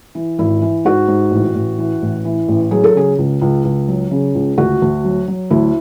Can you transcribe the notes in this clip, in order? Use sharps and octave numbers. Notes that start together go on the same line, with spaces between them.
E3
G#1 E4
E3
G#2 F#4
G#2
A1
A1
E3
A1
E3
A1
F#3 G#4
A4
C#3 G#4
C#2
C#2
C#2
F#3
C#3
C#2
D2 F#4
D2
F#3
F#3
D2 E4